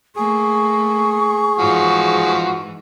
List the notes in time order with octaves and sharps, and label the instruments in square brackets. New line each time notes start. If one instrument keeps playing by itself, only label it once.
[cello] A3 A#3 [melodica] G#4 [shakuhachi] C#6
[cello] G#2 E3 [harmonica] F3 F#4